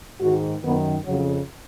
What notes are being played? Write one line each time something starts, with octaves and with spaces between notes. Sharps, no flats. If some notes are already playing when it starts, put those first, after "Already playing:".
G#2 D#3 F#4
F#2 D#3 B3
F2 C#3 F#3